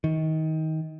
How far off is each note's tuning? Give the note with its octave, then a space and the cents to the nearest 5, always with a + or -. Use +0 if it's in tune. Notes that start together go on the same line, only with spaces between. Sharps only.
D#3 +25